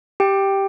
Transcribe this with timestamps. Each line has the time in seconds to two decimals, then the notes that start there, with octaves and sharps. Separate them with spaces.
0.20 G4 G5